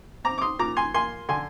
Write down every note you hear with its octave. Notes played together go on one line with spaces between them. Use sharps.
C4 A#5 D6
D6
C6 D#6
A#2 A#5 D6
G#5 C6
A#3 G#5 C6
D3 G#5 C6